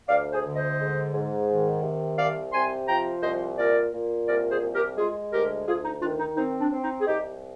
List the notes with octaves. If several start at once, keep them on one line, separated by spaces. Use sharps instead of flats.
D2 D5 F5
G#4 C5
D3
C5 D#5
G#2
G#2
D#3
C3
C2 D5 F5
C3 G#5 C6
F3 G5 A#5
C2 C5 D#5
A#2 A#4 D5
A#2
C2 A#4 D5
G#4 C5
C2
G4 A#4
G#3 F4 G#4
D2 G4 A#4
D2 F4 G#4
D#4
D#3 D4 F4
D#4
C4 D#4
D4
C4
D#4
G#4
C2 D#4 G4